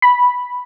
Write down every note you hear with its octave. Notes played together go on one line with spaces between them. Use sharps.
B5